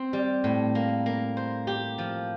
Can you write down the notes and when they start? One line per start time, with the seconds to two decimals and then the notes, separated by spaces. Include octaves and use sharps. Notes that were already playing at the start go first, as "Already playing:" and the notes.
Already playing: C4
0.13 G3
0.44 A2
0.75 A#3
1.06 A#3
1.37 C5
1.67 G4
1.98 F3